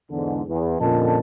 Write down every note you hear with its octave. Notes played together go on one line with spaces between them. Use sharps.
E2 G#2 D3
E2
F2 A#2 D3 C#4 D#5 A5